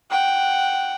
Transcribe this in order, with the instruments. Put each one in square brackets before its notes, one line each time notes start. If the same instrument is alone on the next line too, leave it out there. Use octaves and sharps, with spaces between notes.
[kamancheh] F#5 G5